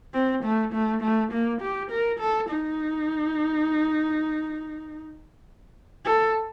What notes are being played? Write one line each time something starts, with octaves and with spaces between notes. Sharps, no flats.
C4
A3
A3
A3
A#3
G4
A#4
A4
D#4
A4